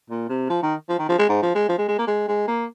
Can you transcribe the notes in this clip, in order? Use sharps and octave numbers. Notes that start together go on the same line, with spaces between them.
A#2
C3
F3
D#3
F3
D#3
F3
G#3
G#2
F3
G#3
F3
G#3
G#3
A#3
G#3
G#3
A#3